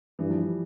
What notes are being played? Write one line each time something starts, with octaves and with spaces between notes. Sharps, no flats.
G2 E3
F3
G3